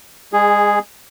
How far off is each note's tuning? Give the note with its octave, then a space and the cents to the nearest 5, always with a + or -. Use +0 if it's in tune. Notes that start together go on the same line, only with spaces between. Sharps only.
G#3 -30 G#4 -5